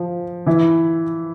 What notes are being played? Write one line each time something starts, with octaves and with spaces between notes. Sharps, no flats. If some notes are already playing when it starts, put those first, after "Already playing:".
Already playing: F3
E3 E4